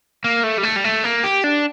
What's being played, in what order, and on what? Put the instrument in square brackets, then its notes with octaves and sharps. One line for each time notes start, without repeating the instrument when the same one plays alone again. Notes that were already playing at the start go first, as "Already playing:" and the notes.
[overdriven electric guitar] A#3
A3
G3
A3
G3
A3
A#3
G4
D4